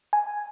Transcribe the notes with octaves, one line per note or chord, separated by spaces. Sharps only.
G#5